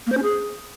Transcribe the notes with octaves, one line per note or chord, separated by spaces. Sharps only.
A#3
C5
C#4
G#4